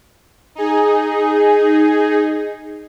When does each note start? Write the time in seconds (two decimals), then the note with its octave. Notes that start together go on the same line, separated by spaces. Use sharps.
0.55 D#4 G#4